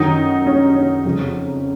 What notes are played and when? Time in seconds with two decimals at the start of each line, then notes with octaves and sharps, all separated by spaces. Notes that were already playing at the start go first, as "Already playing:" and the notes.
Already playing: F#2 D#3 F#3 D#4
0.46 C#4
0.75 C#4
1.05 F2 C#3 F3